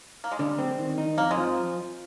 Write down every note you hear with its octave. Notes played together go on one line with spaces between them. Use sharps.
A#3
G#3
D3 G3
C4
D#3
D#4
F2 A#3
G#3
F3